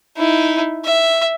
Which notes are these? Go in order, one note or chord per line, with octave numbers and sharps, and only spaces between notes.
D#4 E4
E5